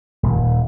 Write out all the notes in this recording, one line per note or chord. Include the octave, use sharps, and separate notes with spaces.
D#1